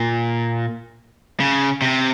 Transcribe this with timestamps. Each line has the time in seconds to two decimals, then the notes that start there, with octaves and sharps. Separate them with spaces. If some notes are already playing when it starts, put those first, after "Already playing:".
Already playing: A#2
1.40 C#3
1.82 C3